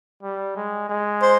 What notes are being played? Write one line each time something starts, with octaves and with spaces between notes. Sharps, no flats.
G3
G#3
G#3
C5